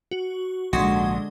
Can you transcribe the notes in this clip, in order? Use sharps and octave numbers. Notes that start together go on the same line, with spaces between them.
F#4
A#1 G#2 D3 G#3 F#4 C6 D#6 G#6